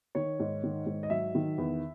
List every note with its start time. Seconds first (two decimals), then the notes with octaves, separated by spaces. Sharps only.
0.15 D#3 C#5
0.40 G#2
0.64 D#3
0.86 G#2
1.03 D#5
1.10 F#3 E5
1.35 D#3
1.58 E2